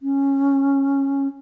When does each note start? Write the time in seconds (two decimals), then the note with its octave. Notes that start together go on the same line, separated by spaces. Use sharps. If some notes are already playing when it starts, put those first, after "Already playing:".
0.02 C#4